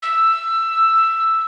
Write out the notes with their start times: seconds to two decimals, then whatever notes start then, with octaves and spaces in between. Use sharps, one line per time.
0.03 E6